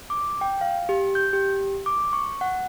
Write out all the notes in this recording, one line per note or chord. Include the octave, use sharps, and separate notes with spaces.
D6
G5
F5
G4
G6
G4
D6
C#6
F#5